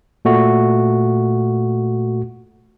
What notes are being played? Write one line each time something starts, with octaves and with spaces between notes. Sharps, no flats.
A#2 A3 F#4